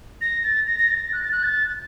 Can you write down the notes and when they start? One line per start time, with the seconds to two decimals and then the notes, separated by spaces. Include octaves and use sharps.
0.21 A#6
0.44 A6
0.67 A#6
0.79 A#6
0.90 A6
1.13 F#6
1.23 A6
1.32 F#6
1.43 A6